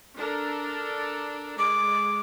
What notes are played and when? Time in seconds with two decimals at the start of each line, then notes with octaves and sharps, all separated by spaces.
0.16 D4 A4 A#4
1.59 G#3 D6